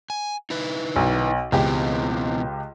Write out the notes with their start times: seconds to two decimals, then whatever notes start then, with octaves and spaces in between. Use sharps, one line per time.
0.10 G#5
0.50 D#4 E4 B4
0.96 B1
1.52 C#2 B2 E3 C4 G4 G5